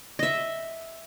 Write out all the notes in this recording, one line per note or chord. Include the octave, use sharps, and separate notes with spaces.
D#5 E5